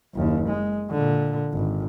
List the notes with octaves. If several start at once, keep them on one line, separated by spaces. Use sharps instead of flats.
F#1 D#2
G#3
A#2 D3
G#1